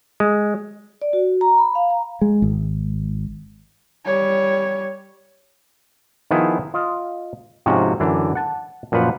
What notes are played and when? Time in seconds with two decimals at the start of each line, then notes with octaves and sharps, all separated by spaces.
0.20 G#3
1.02 D5
1.13 F#4
1.41 A#5
1.58 B5
1.75 F5
1.90 A#5
2.21 G#3
2.42 G#1
4.05 G3 C#5
6.31 D#3 F3 B3 E4 G#4
6.74 F4 D#5
7.66 G#2 C3 F3 C#4 F#4
8.00 F#2 D3 E3 D4
8.35 F#5 A5
8.92 F#2 A#2 F3 B4 F#5